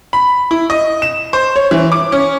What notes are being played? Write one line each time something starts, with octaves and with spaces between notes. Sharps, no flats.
B5
E4
D#5
E7
C5
C#5
E3
D6
C#4